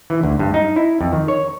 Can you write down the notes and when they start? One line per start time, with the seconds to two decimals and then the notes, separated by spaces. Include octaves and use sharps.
0.10 E3
0.23 D2
0.39 G2
0.54 D#4
0.76 E4
1.01 F2
1.13 D#3
1.28 C#5